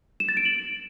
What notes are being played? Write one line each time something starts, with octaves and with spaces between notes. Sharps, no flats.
E7
A6
D7
F#7